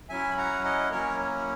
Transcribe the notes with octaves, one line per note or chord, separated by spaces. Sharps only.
F#3 C#4 E4 E5 G#5
B5
F#5 A#5
D#5 F#5
F#3 A#3 C#4 E4 A#4 C#5